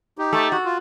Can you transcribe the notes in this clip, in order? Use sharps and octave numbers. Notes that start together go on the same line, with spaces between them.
D#4 G4
A3
F#4
F4